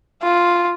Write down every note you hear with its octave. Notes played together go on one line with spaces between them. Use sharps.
F4